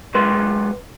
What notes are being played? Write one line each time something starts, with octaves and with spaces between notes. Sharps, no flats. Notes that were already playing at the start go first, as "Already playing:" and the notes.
B1 G#3 B4 C6